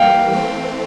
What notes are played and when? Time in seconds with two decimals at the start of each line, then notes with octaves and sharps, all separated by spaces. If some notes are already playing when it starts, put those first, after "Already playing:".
Already playing: E3 G3 A#3 F5 G5
0.31 E3 A3 C4